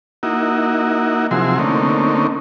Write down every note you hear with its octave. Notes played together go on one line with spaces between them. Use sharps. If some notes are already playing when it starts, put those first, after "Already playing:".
A#3 D#4 E4 F#4
C3 F3 F#3 E4 G#4 C6
D3 A3 A#3 C4 C#4 D#4